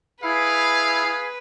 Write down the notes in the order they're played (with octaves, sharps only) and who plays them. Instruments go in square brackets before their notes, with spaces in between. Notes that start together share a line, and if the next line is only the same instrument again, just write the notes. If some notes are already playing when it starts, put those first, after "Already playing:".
[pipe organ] E4 [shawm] G#4 [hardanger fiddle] B4 [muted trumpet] F5